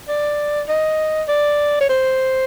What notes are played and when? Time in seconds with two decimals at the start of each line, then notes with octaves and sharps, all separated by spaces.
0.08 D5
0.69 D#5
1.28 D5
1.81 C#5
1.89 C5